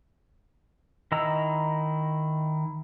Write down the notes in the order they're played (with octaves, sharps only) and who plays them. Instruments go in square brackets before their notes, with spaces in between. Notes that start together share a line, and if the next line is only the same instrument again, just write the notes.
[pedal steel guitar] D#3 E4 D#5 A#5 E6